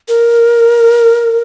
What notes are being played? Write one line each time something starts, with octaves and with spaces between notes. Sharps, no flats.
A#4